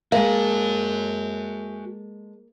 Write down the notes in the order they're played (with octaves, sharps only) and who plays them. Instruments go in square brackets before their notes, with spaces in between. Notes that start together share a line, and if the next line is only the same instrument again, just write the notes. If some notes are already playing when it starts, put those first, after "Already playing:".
[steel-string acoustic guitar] G#3 A4 [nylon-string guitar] A#3 [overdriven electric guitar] F#4 G#5 [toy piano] F5